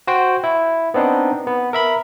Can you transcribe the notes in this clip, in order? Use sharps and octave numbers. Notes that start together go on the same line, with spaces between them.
F#4 C5 G5
E4
B3 C4 D4 D#4
B3
A#4 E5 B5